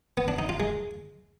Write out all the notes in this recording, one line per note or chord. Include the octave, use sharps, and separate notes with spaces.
B3
D4
D#4
F4
G#3